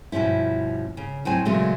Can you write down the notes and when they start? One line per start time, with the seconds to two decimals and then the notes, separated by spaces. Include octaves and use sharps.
0.12 G2 B2 F3 C#4 E4
0.97 C#3
1.25 A2 F#3 C4 G#5
1.45 A#2 C#3 F#3 G#3 A3